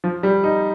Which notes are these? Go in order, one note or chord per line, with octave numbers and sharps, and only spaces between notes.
F3
G3
D#4